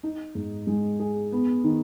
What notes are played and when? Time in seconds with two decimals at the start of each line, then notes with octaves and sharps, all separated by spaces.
0.03 D#4
0.35 G#2
0.67 G#3
1.00 G#4
1.32 B3
1.64 D#3